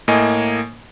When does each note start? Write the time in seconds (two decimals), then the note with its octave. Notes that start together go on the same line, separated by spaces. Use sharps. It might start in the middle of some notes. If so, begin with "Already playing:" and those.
0.08 A2 A#3 D#5 G#5